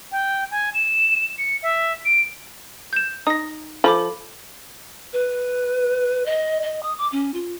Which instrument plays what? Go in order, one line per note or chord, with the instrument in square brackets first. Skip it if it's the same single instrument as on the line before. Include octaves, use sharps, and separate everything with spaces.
[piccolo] G5
G#5
E7
C#7
E5
D7
[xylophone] G6 E7
[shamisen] D#4 [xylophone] D#6 A#6
[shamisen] F3 [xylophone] A4 B5 D6
[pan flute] B4
D#5
D#5
D#6
D6
C#4
F4